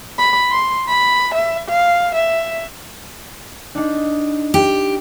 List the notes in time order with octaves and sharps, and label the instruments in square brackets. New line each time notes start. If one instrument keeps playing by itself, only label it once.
[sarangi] B5
C6
B5
E5
F5
E5
[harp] D4 D#4
[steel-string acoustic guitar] G4